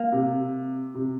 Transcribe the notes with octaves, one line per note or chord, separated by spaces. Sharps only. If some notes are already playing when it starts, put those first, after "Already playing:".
Already playing: A#3
C3
C3